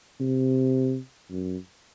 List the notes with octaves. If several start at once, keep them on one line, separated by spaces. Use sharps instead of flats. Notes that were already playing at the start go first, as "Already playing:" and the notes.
C3
F#2